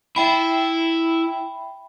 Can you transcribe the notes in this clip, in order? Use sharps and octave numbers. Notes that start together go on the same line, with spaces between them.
E4 E5 G5 B5